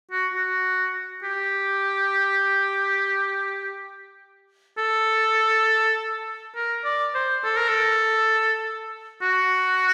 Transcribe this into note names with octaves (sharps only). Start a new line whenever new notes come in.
F#4
F#4
G4
A4
A#4
D5
C5
A4
A#4
A4
F#4